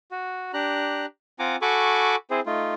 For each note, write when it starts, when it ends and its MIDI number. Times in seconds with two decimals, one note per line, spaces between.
0.11 0.52 66
0.53 1.06 62
0.53 1.06 67
0.53 1.06 82
0.53 1.06 90
1.39 1.56 60
1.39 1.56 65
1.39 1.56 78
1.39 1.56 80
1.39 1.56 82
1.39 1.56 86
1.62 2.16 66
1.62 2.16 69
1.62 2.16 80
1.62 2.16 83
1.62 2.16 85
1.62 2.16 86
2.31 2.40 60
2.31 2.40 64
2.31 2.40 68
2.31 2.40 72
2.46 2.74 57
2.46 2.74 63
2.46 2.74 65